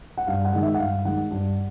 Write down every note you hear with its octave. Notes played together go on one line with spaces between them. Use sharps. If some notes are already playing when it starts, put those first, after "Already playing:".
F#5
G2 F5
F#5
D#3 G#3
E5
F#5
G2 F5
D#3 G#3 F#5
G2